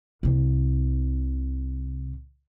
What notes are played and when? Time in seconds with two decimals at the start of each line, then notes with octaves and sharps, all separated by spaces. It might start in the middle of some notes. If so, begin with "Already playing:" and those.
0.23 C2 C3